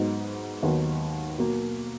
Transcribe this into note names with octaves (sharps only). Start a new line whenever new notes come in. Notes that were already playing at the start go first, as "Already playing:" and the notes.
Already playing: G#2 F#3 B3 D#4
D#2 D#3 F#3 B3 D#4
B2 F#3 A#3